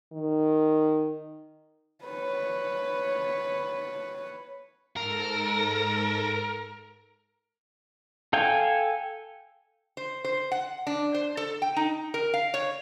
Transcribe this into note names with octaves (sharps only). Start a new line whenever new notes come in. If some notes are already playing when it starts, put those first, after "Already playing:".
D#3
B4 C#5
G#2 A4 A#4 A#6
A4 F5 G5 G#5
C5
C5
F#5
D4
C5
A4
G5
D#4
A#4
F5
C#5